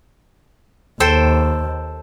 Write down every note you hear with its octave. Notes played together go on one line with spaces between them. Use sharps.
D#2 A4 C5 G5